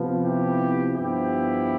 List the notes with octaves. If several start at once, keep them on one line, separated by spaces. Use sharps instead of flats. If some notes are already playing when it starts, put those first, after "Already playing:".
Already playing: C3 F3 B3
E4 G4
G2 F3 B3 E4 G4